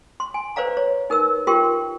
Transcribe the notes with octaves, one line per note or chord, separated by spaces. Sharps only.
C6
G#5
B4 C5 D5 F5 A#5
C#5
D#4 A#4 B4 E6
F4 G4 A#4 G5 C6